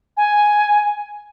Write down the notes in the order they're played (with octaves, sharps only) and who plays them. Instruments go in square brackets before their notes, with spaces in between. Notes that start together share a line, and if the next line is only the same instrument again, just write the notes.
[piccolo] G#5